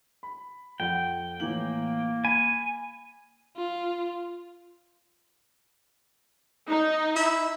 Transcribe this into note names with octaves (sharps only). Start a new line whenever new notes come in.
B5
F2 F#5 G5
A2 E3 A#3 F#7
G#5 B5
F4
D#4
E4